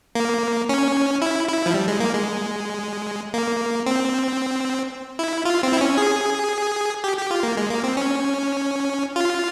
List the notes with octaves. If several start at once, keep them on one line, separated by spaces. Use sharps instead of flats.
A#3
C#4
E4
E4
F3
G3
G#3
A#3
G#3
A#3
C4
E4
F4
C4
E4
C#4
G#4
G4
G4
F4
A#3
G#3
A#3
C4
C#4
F4